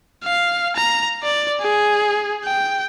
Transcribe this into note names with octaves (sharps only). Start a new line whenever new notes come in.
F5
A#5
D5
G#4
G5